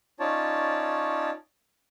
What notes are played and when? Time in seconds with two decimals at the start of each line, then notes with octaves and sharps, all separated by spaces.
0.20 C#4 D#4 F4 C#5 D5 A5